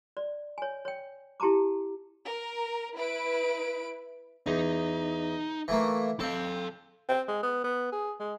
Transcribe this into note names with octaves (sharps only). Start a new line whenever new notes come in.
D5
C#5 G#5
C#5 G5
E4 G4 A5 A#5 D6
A#4
E4 B4 D7
E2 D#4
E3 A3 A#3
C4 A4 F5
C4
G#3
B3
B3
G#4
G#3